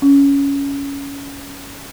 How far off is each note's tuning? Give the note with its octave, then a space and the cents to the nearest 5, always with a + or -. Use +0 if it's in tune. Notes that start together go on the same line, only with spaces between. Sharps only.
C#4 +15